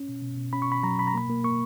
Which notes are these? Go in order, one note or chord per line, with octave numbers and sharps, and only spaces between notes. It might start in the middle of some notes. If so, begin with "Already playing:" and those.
Already playing: C#4
B2
B2
B2
C#4 B5
C#6
B2 B5
F#3 A#5
B2 B5
A#5
A#3 B5
A#3
A#3 C#6